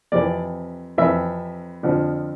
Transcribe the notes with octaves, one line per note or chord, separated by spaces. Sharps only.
F2 C3 E3 D5
F2 C3 E3 E5
F2 D3 F3